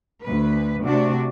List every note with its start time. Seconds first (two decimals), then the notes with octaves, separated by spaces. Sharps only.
0.22 D2 B4
0.82 C3 A3 D4 F#4